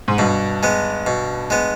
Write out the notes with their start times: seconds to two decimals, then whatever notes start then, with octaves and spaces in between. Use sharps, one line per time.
0.08 G#2
0.18 G2 B2
0.63 G#3 B3
1.07 B2
1.50 G#3 B3